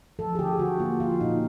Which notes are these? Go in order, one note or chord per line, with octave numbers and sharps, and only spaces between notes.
F3 A4
G#4
D3 G4
D3 F#4
A#3 F4
F3 F4
A#2 D#4